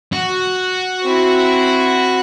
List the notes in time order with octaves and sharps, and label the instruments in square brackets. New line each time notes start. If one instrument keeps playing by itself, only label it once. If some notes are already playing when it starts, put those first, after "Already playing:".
[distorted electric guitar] F#4
[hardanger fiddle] C4 E4